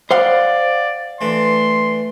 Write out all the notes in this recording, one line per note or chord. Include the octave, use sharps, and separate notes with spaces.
C5 D5 F5 F#5
E3 A3 D4 C6